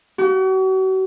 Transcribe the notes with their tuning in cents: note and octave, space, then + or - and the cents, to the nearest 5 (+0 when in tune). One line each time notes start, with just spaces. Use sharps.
F#4 +40